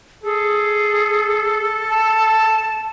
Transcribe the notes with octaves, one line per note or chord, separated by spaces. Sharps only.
G#4 A4
A5